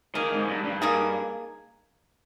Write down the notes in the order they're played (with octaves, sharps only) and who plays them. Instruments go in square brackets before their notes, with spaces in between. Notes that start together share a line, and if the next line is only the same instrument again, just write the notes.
[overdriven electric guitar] D#3 [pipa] A#3 D#4 G#4
[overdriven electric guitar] G#2
G2
G2
[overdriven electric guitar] G2 [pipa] A#3 D#4 G#4